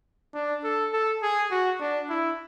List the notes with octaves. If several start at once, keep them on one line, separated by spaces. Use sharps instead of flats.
D4
A4
A4
G#4
F#4
D4
E4